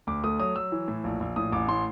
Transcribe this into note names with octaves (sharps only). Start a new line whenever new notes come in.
D2 D6
A3 D#6
F#3 D#6
F#3 E6
E3
A2
A#1
A#1
A2 D#6
A1 D6
A2 C6